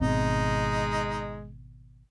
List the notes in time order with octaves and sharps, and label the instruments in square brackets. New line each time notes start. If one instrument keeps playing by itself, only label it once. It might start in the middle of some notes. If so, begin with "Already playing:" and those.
[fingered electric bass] G#1 B2 C4 [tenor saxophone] G#3 [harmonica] D#4